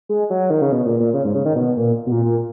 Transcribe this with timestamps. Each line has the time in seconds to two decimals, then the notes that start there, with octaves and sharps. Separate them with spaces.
0.09 G#3
0.30 F#3
0.50 D#3
0.61 C#3
0.72 B2
0.86 A#2
1.00 A#2
1.14 C#3
1.25 G#2
1.35 C#3
1.45 D#3
1.56 B2
1.77 A#2
2.07 B2
2.12 A#2
2.26 A#2